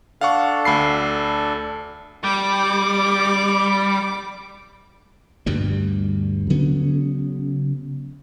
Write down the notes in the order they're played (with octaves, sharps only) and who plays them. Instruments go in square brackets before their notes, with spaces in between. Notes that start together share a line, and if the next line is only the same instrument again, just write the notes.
[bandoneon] D4 A4 [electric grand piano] F5 F#5 C#6
[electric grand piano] D2 B5 C7
[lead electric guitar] G3 [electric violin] D6
[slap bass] D2 G2 B2 G3
C#3 F#3 B3 C#4